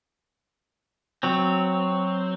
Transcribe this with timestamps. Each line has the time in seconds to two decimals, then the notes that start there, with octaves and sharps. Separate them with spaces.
1.23 F#3 C4